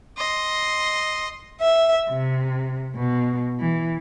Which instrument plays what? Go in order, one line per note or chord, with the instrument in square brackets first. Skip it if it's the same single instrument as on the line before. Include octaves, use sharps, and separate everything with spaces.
[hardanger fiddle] D#5 C6
[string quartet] E5
C3
B2
E3